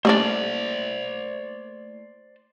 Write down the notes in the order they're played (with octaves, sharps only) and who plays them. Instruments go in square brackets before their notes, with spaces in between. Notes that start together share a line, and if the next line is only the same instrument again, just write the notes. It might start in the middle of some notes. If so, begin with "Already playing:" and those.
[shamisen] G3 C#4 D4 [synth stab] A3 A#3 E4 [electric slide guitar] C5 D5